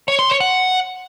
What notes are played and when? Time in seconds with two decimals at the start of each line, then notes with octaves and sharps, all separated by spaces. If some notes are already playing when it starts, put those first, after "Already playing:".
0.08 C#5
0.19 C6
0.30 C#5
0.40 F#5